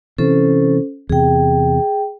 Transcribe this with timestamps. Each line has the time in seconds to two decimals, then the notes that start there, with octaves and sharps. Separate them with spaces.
0.18 C3 E3 C#4 A4 C5
1.10 E2 C3 G#4 G5